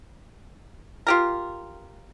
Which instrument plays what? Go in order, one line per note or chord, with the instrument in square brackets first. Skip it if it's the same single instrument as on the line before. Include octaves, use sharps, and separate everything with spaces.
[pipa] F4 G4 A#4